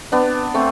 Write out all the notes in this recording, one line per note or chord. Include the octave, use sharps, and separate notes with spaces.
B3 D4
A3 C4